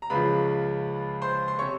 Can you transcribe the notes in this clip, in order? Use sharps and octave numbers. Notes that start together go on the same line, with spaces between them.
A#5
C#2 C#3 F3 B4 B5
C5 C6
C6
C3 C#5 C#6